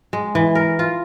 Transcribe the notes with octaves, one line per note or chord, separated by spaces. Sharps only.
G#3
E3
A#4
F4